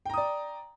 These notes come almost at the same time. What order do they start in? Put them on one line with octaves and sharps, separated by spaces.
G5 A#5 D#6 D5